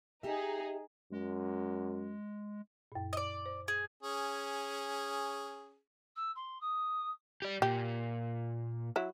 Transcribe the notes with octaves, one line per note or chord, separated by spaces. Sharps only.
D#4 G4 G#4 E5
F#2 G#3
F#2 A#2
D5 D#5
C5
G#4
C#4 G#4
E6
C6
D#6
G4 D5
A#2 G4
F#3 E4